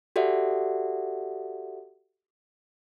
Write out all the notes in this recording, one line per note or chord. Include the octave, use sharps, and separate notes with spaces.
F#4 G4 A4 D5 E5 F#5